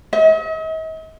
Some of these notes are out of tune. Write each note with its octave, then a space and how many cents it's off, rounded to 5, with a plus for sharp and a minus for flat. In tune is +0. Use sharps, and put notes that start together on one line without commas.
D#5 +45